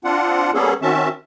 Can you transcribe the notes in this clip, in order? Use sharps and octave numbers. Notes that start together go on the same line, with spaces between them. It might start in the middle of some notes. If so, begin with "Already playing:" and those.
C4 D4 F4 F#5
G3 A#3 B3 C#4 G#4 A4
D#3 C4 C#4 F#4 E5 A5